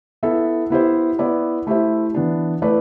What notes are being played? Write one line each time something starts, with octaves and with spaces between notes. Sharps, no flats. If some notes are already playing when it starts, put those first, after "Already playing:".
B3 E4 A4 E5
B3 E4 G4 C5 E5
B3 E4 B4 D5
A3 E4 G4 C5 E5
E3 B3 D4
A3 E4 B4 D5